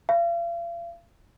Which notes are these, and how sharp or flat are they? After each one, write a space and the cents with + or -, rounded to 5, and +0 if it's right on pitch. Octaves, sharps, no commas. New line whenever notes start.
F5 -40